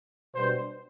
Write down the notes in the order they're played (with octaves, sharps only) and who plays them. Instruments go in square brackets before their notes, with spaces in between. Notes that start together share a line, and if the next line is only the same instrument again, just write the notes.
[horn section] B2 G3 B3 D4 C5